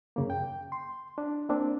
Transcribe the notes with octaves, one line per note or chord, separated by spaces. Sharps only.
F#2 C#3 A#3
G5
C6
D4
A#3 C4 D4